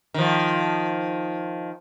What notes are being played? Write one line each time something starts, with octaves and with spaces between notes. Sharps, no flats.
D#3 F3